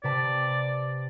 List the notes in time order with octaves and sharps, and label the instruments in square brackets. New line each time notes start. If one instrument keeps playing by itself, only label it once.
[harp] C3 B4 A5 [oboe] D5